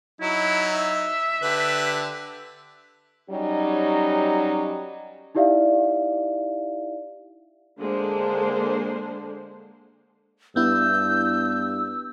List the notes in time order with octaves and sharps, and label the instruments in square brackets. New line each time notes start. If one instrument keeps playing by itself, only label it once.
[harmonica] F#3 D#4 [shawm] E4
[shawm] E5
[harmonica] D3 G4 B4
[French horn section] F#3 G3 C#4 D#4 G4
[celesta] D#4 E4 G4 D5 E5 F5
[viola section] D3 G#3 A#3 D4 C5
[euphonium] G2 [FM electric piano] B3 E4 [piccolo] E6 [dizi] G6